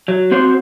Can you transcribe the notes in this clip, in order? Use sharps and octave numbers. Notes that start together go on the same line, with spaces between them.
F#3
C4 F#4 C5